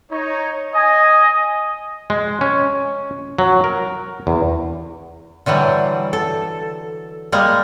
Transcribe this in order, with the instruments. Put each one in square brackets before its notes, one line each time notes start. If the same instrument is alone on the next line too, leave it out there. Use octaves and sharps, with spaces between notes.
[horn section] D#4 C#5
[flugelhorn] D#5 [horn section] G#5
[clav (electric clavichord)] G#3
C#4
F#3
A#4
E2
[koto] D3 E3 F#3 G3
A4
G3 G#3 A#3